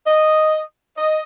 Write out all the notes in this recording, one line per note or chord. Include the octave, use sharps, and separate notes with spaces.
D#5
D#5